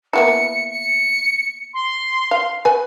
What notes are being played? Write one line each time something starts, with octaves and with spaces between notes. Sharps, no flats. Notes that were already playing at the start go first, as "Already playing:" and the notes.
A#3 B3 E4 C#7
C#7
C6
F5
B4 G#5